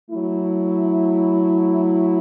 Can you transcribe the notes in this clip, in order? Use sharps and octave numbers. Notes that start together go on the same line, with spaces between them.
F#3 A3 E4